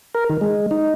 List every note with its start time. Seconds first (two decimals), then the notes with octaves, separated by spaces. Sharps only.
0.15 A#4
0.30 D#3
0.41 G#3
0.71 D#4